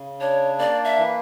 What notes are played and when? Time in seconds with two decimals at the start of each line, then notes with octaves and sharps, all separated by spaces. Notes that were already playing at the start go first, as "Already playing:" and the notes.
Already playing: C#3
0.20 D4 C#5
0.59 A#3 D5
0.85 E5
0.98 E3